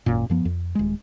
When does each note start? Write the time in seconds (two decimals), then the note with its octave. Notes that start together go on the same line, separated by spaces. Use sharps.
0.06 G#1 F#2 A#2
0.30 F#2 F3 B3
0.45 F2
0.75 D#1 G#3